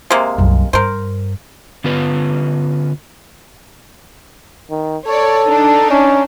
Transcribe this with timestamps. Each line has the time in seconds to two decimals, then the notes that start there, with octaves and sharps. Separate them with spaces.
0.10 C3 G#3 A#3
0.38 C2 F#2
0.73 G2 A#4 C5
1.84 D3 B3 C#4 F4 B4
4.70 D#3
5.06 A4 C#5 D5
5.49 D4 D#4
5.91 C#4